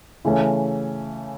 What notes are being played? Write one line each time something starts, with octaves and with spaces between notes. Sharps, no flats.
C#3 E3 A3 C#4